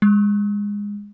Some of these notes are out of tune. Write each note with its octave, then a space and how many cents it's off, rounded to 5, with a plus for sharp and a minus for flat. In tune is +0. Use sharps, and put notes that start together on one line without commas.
G#3 -20